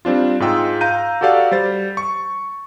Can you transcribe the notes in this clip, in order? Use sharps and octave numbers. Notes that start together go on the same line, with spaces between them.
G3 C4 D4 F4
G#2 G#3 F4 G#4 G5 E6
F5 A#5 G6 D#7
F#4 G4 A4 D5 F5 F#5
G3 C5 A6
C#6